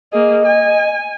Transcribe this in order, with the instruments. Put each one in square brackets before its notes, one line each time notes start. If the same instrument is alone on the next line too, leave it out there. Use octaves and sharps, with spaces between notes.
[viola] A#3 G#4 [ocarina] D#5
[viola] G#5